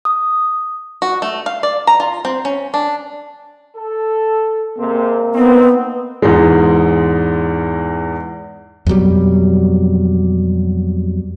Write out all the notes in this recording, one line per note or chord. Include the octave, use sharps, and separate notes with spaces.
D#6
F#4
A3
F5
D5
A#5
F4
C4
C#4
D4
A4
C3 G#3 A#3 C4
B3 C4 D#4
E2 G#2 G#3
F2 B2 F#3 G3